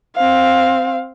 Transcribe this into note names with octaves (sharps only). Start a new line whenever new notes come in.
C4 F5